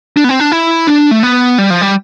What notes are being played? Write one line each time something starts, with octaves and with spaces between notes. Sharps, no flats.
D4
B3
C4
D4
E4
D4
A3
B3
G3
F3
G3